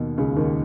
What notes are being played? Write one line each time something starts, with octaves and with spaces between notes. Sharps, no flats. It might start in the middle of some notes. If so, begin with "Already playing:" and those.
Already playing: D#2 B2 D#3
C#2 C#3
D#2 D#3